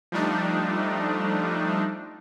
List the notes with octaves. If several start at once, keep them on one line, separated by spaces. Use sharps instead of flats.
F3 G3 A3 D4 D#4